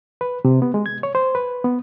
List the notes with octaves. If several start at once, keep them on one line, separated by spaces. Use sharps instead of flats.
B4
C3
B3
G#3
G#6
C#5
C5
B4
B3